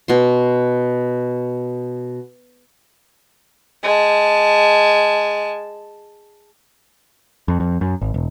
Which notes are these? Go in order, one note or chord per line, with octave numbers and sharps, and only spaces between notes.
B2 C6
G#3 A5
F2
F2
F#2
G#1
E1